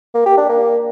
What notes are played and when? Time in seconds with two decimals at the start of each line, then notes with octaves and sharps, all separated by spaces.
0.15 A#3
0.26 G4
0.38 D4
0.49 A#3